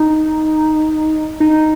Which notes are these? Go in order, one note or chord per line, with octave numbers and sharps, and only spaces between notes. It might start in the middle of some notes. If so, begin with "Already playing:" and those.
Already playing: D#4
D#4